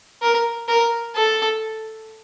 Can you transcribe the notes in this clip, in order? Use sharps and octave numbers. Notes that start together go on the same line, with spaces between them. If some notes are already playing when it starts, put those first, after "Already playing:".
A#4
A#4
A4